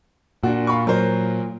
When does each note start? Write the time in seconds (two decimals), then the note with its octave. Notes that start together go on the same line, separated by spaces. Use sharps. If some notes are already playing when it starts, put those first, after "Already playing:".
0.43 A#2 D4 F#4
0.67 F5 B5 C#6
0.87 F#3 A#4 C5